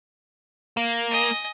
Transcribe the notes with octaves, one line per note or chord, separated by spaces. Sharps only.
A#3
D#5 G#5